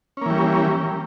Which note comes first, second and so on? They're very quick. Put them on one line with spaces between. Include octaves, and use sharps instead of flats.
C#4 A#3 E3 G3